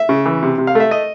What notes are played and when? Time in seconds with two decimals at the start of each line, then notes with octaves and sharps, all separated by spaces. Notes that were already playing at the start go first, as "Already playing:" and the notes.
Already playing: E5
0.09 C#3
0.26 E3
0.43 C3
0.58 C3
0.67 F5
0.75 A3 E5
0.91 D#5